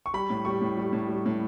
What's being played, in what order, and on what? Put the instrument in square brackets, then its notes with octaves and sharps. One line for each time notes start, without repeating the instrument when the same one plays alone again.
[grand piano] C#6
G3 B5
A2
G3 C#6
A2
G3
A2
G3
A2